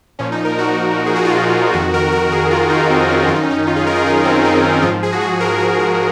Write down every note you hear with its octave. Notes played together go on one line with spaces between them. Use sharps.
A#2 F3 C#4
D#4
A#4
F#4
G#4
F#4
F4
F2 D#3 F#4
A#4
A#4
G#4
F4
D#4
C4
C#4
F#2 D#3 F4
D#4
C#4
D#4
F4
G#4
A#4
G#4
D#4
C#4
C4
C#4
D#4
G#2 F3 F4
G#4
F#4
G#4
A#4
G#4
F#4